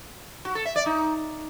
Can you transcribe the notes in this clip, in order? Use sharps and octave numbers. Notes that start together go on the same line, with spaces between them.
F#4
A4
E5
D5
D#4